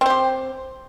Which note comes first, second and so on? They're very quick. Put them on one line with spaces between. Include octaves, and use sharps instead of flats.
C4 C5 G4